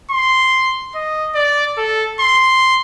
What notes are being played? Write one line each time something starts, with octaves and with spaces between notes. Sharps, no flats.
C6
D#5
D5
A4
C6